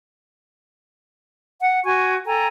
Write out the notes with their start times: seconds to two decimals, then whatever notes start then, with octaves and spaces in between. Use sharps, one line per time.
1.60 F#5
1.84 F#4 G#5 C#6
2.25 A4 G5 G#5 A#5